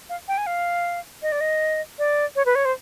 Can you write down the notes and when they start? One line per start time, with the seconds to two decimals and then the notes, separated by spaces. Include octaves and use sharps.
0.09 F5
0.28 G5
0.38 G#5
0.47 F5
1.23 D#5
1.32 D5
1.41 D#5
1.99 D5
2.36 C#5
2.46 B4
2.55 C#5
2.65 C5